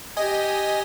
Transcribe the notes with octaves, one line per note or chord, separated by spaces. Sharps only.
G4 D#5 G#5